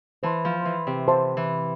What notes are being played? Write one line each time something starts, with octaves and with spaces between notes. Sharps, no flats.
E3 C5 E5 A5 C6
F3
E3
C3
C5 E5 A5 C6
E3